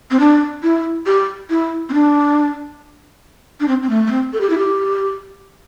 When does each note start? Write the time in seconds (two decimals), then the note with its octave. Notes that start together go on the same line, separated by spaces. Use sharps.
0.11 C4
0.20 D4
0.63 E4
1.06 G4
1.50 E4
1.89 C4
1.94 D4
3.60 D4
3.68 C4
3.83 C4
3.90 A3
4.07 A3
4.11 C4
4.33 A4
4.41 G4
4.50 E4
4.58 G4